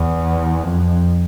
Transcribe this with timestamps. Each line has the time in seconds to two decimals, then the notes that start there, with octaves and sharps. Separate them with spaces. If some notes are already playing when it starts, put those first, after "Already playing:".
Already playing: E2
0.63 F2